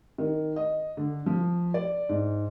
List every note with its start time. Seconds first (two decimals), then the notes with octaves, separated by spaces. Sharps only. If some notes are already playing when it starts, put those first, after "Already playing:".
0.18 D#3
0.56 D#5
0.97 D3
1.26 F3
1.74 D5
2.09 G#2